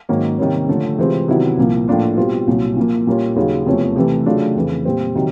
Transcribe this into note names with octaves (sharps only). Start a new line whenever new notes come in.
G#2 D#3 F#3 A#3 C#4
C3 D#3 G3 A#3 C#4
D3 F3 A3 C#4
C3 E3 G#3 C4 F4
C3 D#3 F#3 B3 E4
C2 A#2 F3 A#3
A2 F3 A#3 D4 F4
B2 G3 C4 F4
C2 A#2 F#3
A#2 F3 A#3
A#2 G3 A#3 C#4 F4
D#2 C#3 F#3
E2 C3 F3 A3 C#4
C3 E3 A3
C#3 F#3 A3 D4 F4
F2 C#3 E3
A#2 G3 C4
C3 D#3 F#3